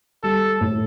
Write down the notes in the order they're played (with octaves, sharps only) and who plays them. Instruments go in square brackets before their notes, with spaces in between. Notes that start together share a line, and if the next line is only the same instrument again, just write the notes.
[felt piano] G3 [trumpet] A4
[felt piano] A2